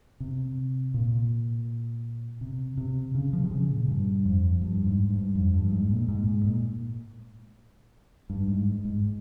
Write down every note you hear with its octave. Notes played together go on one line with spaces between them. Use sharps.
C3
A#2
C3
C3
C#3
F3
C3
C#3
A#2
G2
F2
G2
G#2
G2
F2
G2
G#2
A#2
G#2
G#2
A#2
G2
G#2
G#2